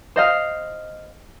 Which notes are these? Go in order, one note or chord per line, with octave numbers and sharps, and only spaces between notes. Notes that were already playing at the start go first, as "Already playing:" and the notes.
C5 D#5 F5